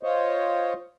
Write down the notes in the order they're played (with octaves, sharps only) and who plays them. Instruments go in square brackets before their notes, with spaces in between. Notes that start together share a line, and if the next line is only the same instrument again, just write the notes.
[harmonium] F4 C5 C#5 D#5